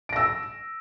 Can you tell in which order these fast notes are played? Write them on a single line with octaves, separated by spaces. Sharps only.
D7 A#6 E6